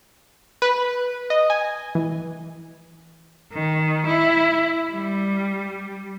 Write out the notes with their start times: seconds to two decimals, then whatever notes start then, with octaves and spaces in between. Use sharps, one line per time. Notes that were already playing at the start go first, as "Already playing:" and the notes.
0.62 B4
1.30 D#5
1.50 G#5
1.95 E3
3.54 D#3
4.07 E4
4.93 G3